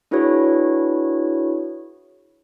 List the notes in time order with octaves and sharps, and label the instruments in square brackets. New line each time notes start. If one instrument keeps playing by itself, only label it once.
[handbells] D4 E4 F#4 G#4 B4 C#5